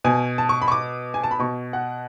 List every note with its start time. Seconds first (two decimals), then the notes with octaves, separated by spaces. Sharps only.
0.04 B2 G#5
0.38 A5
0.49 C#6
0.62 B5
0.68 C#6
0.72 D6
1.14 G#5
1.24 A5
1.31 B5
1.39 B2 C#6
1.73 F#5